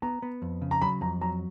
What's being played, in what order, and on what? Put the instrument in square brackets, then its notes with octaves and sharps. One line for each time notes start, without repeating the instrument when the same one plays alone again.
[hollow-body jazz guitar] B3 [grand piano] A#5
[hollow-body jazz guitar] B3
F2
C#3
[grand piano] A#5
[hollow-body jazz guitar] F#3 [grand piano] B5
[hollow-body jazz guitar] F2 [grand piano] A#5
[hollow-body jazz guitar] F#3 [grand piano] A#5